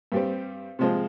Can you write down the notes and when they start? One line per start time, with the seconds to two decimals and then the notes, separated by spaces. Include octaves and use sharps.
0.12 G2 G3 C4
0.79 C3 F3 G#3 C4